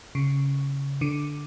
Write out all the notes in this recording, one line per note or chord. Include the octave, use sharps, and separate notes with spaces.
C#3
D3